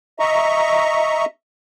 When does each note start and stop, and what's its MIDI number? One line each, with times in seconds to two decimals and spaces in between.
0.19 1.25 75
0.19 1.25 76
0.19 1.25 82
0.19 1.25 85